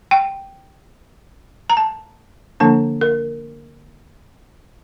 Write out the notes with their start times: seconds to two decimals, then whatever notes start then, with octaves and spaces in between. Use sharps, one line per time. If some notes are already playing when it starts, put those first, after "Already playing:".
0.11 G5
1.70 A#5
1.77 A5
2.60 D3 F3 A#3 D4 A5
3.01 A#4